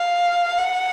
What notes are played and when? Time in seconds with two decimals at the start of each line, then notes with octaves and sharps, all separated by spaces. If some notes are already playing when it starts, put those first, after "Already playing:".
Already playing: F5
0.58 F#5